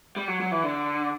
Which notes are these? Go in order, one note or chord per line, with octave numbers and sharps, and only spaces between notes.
G3
F#3
F#3
E3
D3